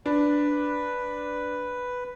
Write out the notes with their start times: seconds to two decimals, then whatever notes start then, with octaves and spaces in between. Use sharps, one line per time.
0.06 D4 B4